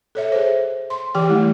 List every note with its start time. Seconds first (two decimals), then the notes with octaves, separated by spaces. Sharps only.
0.15 A4 C#5 E5
0.32 G#4 C5
0.90 C6
1.14 E3 G4 G5
1.29 G3 A3 E4